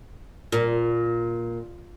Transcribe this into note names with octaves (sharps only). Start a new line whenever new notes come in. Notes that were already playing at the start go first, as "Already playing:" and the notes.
A#2